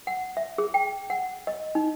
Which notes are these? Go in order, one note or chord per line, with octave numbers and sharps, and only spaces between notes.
F#5
E5
G#4
G5
F#5
D#5
D#4